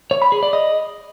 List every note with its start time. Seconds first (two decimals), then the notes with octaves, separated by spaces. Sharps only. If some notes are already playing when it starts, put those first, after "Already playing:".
0.11 C#5
0.22 B5
0.32 G#4
0.43 D5
0.53 D#5